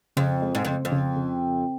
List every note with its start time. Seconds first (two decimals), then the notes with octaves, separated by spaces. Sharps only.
0.17 F2 C#3
0.42 G#3
0.55 G#2
0.65 F2 C#3
0.85 F2
0.92 C#3
1.17 C#3